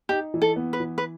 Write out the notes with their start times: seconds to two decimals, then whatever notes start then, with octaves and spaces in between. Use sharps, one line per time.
0.09 D#4 G4
0.34 E3
0.42 A4
0.56 B3
0.73 B4
0.80 E3
0.98 B4